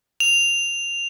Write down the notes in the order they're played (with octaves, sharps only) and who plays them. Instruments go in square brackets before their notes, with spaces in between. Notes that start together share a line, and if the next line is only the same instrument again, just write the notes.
[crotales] F7